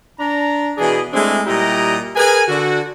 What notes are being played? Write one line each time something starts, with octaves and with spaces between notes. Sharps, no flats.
D4 A#5
B2 E3 D4 G#4
G#3 A3 C4 D4 E4 G#4
A#2 G3 E4 G4 D#5 A#5
G#4 A#4 B4 G#5
D3 F#4